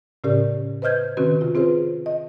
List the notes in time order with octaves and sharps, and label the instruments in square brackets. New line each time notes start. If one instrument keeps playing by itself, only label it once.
[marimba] A2 C#3 C#4 G4 A#4 D5
B4 C5 D#5 F6 G6 G#6
C3 D#3 C4 C#4 F#4 B4
C3 F4
C4 F4 G#4 B4 C5
D#5